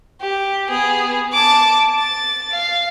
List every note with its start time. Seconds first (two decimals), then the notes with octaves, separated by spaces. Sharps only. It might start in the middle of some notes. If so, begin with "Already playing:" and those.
0.21 G4
0.69 B3 G#4
1.33 A5 D6
1.98 A6
2.52 F5